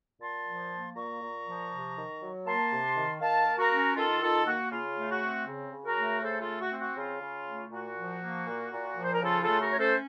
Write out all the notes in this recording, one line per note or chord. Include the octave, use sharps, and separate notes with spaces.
A#2 A5 C6
F3
A#3
A#2 A#5 C#6
A#2
F3
C3
D#3
F#3
A#3 A5 C6
C3
D#3
D#3 F5 A5
A#3
F#4 A#4
C#4
D#3 F4 A4
D#3 F4 A4
A#3 F#4
C#3 F4
A3
F#4
C4
C#3
C#3
F#4 A#4
A3
C#3 A4 C5
F4 A4
A3
F#4
C4
F#4
C#3 F4
C#3
A3
A#2 F#4
F3
A#3
A#2
A#2
F3
C5
A#4
C#3 F4 A4
F4 A4
A3
F#4 A#4
C#4 C#5
A4 C5